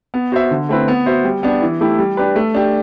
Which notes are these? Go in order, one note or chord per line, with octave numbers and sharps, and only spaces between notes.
B3
F#4 C5 E5
D3
A3 C4 E4 B4
B3
F#4 C5 E5
G3
B3 D4 G4
E3
A3 E4 G4
G3
D4 G4 B4
A3
D4 G4